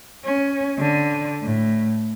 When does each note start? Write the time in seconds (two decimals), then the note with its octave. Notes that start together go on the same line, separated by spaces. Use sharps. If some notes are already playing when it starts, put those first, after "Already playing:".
0.25 C#4
0.79 D3
1.42 A2